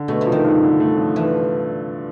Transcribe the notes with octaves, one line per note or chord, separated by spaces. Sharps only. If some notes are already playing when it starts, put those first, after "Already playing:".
Already playing: D3
B2 A3
C3
F3
D#3
G2
D3
A3
F3
E3